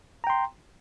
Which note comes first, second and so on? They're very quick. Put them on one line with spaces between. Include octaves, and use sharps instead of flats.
A#5 G5 C6